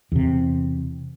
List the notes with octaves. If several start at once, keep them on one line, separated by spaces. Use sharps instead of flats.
E2 C3